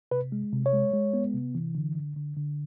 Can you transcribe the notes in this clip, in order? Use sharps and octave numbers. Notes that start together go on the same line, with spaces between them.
C3 B4
G#3
C3
C#5
G#3
G#3
B3
C3
E3
D3
D3
D3
D3